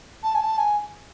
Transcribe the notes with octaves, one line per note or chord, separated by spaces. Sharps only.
A5
G#5
A5
G#5